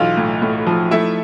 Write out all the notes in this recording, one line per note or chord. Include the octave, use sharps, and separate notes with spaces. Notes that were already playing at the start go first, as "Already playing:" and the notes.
Already playing: B1 E3 F4 F5
A2
A2
F3
A3 E4 E5